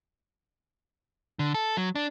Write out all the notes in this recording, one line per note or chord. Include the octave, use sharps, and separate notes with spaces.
D3
A4
F#3
D4